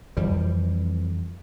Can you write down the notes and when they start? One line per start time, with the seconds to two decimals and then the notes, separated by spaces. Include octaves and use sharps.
0.17 F2 E3 G3